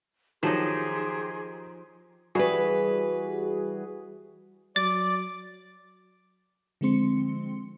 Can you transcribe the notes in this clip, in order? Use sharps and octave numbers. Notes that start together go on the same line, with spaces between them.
D#3 F3 F#3 D#4 G4 G#4 C6
E3 G3 F#4 G#4 B4
F#3 D5 A6
D3 F3 G#3 C4 C6 C#7